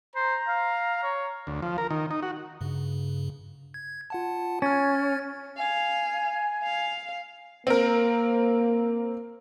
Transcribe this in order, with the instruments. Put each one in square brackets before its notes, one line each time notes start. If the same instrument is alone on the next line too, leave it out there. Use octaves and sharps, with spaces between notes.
[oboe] C5 [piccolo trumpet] A#5
[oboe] F5
C#5
[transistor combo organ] D2
F3
A#4
D#3
D#4
F#4
[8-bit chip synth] G2 C#3
G#6
F4 F#5 A5
[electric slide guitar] C#4 [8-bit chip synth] F6 G#6 A6
[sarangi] F5 [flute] G#5
[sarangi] F5
[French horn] A#3 [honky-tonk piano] C4 A#4